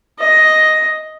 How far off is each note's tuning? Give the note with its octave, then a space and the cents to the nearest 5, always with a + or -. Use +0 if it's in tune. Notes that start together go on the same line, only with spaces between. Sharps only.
D#5 +5